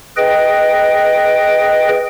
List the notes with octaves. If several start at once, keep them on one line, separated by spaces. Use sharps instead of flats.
G#4 B4 D#5 G5